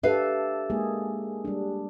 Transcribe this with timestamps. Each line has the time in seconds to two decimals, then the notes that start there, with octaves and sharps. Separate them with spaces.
0.03 D4 G4 A4 B4 E5 F5
0.70 G#3 A#3 G#4
1.45 G3 D4